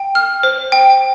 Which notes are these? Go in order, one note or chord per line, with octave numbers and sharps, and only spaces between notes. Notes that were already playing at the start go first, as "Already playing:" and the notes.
Already playing: G5
F6
C5
G5